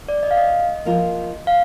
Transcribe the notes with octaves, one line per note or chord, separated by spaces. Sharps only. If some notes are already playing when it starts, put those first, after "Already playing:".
D5
D#5
F5
D#5
F3 A#3 F4 A#4
F5